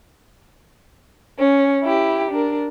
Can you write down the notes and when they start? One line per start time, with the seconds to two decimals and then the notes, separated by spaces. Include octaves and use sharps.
1.39 C#4
1.84 E4 G4
2.31 D4 A#4